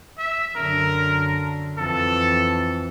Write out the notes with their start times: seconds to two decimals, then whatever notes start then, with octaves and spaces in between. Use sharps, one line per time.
0.18 E5
0.56 F#2 D3 A#4
1.78 F2 E3 A4